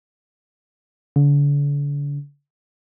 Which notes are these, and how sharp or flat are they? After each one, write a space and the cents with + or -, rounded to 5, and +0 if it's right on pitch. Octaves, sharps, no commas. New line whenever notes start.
D3 -40